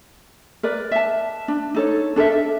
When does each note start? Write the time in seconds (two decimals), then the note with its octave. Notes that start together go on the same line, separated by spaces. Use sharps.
0.63 A#4 B4 D5
0.92 E5 A5
1.48 D4
1.75 D#4 A4 C#5
2.16 D4 A4 A#4 E5
2.32 E5